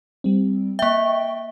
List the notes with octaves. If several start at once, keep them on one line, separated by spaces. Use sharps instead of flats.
G3 C4
A#3 E5 G5 C#6